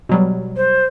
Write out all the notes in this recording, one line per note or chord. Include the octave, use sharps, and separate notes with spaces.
B2 F#3 G3
C5